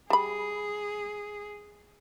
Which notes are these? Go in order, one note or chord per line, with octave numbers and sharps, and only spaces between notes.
G3 G#4 B5